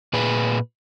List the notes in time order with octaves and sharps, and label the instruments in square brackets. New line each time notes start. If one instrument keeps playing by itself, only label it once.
[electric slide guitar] A#2 G#4 B4